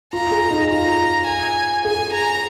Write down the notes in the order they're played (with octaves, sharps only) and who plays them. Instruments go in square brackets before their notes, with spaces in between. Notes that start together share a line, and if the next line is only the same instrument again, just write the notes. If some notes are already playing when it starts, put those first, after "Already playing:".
[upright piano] F4 [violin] A#5
[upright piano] G#4
D#4
[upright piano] F4 [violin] A#5
[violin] G#5
[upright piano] G#4 [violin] G#5
[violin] A#5